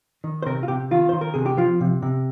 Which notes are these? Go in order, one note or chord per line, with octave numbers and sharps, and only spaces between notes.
D#3
C5
C3 A#4
F4
C3 G4
D#3 F4
D#3 C5
A#4
C3 G#4
G4
F3 F4
C3
C3